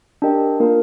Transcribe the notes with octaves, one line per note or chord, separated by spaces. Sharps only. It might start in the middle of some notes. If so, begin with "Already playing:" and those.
D4 G4 A#4 D#5 G5
A#3 D4 F4 A#4